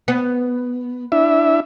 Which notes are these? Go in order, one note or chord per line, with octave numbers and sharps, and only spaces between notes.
B3
D4 E4 E5